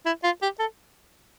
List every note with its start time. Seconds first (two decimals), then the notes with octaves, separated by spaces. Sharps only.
0.06 E4
0.24 F4
0.42 G4
0.59 A4